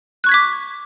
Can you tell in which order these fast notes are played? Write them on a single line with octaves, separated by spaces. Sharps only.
F#6 C#6 G#6 B6 D6